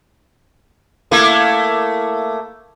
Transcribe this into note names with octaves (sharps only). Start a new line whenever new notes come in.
A3 A#3 E4